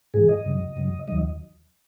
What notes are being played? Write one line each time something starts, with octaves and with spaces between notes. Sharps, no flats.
G#2 E3 G#4
D#5
F#2 C#3 F#3
F#2 C#3 F#3
D#2 D#3 F#3 D#5